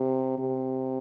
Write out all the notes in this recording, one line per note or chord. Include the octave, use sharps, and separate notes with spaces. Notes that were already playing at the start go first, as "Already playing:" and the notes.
Already playing: C3
C3